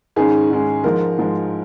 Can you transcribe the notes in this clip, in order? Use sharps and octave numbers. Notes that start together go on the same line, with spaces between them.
G#2 D#3 G#3 C#4 G#4
G#2 D#3 G#3 C#4
G#2 F3 G#3 A#4
G#2 F3 G#3